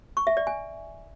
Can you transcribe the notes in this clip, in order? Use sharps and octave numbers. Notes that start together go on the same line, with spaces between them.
C#6
E5
D5
G#5